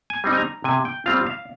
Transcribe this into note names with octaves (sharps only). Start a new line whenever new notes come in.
G#5
G3 C4 D#4
G#5
A#5
C3 G#5
G5
G3 C4 F4 F5
F5